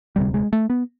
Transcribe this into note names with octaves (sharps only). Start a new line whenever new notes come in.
E1 D2 C3 G3
G#3
A3
B3